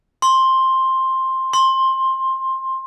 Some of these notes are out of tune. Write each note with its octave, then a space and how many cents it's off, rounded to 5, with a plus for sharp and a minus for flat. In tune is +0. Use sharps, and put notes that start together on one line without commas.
C6 +10
C6 +15